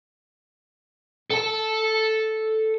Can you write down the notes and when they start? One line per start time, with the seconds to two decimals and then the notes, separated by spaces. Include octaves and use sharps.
1.30 A4 A5